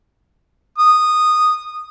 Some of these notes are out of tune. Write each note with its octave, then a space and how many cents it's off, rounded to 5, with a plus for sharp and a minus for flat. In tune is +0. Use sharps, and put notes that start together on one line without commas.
D#6 -10